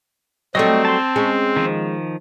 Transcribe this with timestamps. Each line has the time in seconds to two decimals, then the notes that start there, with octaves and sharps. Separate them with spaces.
0.55 F#3 G3 A3 C4 D#5
0.85 A5 C6
1.16 G#3 C#4
1.56 D#3 F3